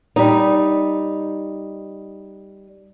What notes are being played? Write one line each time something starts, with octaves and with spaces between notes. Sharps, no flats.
G3 D#4